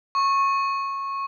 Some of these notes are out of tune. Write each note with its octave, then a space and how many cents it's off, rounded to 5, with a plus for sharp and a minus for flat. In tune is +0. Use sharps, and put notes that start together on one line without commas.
C#6 -15